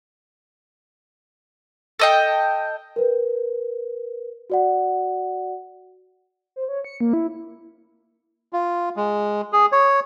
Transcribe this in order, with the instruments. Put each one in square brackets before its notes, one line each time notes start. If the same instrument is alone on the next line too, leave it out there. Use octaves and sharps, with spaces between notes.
[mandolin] A4 D#5 G5
[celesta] A#4 B4
F#4 D5 F#5
[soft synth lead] C5
C#5
C#7
A#3
E4
[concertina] F4
G#3
G#4
C#5